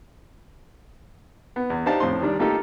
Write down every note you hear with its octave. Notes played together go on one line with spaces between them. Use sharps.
B3
E2
D4 D#4 G4 C5 F5 A5
F2 A2 C5 C6
D#3 G3 D4
A3 A#3 D#4 F4 G4 A4